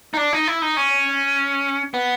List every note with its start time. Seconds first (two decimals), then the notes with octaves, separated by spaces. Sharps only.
0.14 D#4
0.17 D4
0.33 D#4
0.48 E4
0.62 D#4
0.77 C#4
1.94 B3